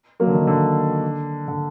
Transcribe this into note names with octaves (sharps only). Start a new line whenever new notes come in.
F#3 A#3
D3
D#3
D3
D3